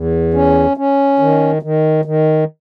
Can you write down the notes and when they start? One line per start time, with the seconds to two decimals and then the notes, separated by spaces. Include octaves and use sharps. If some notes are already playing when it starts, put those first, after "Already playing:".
Already playing: E2
0.34 C#4
0.77 C#4
1.19 D#3
1.62 D#3
2.05 D#3